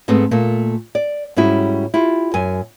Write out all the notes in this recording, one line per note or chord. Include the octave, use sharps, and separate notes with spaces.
G#2 A3 B3 C4
A#2 A3 A#3
D5
G#2 G3 C#4 E4 F#4
E4 F4 G4
F#2 G#5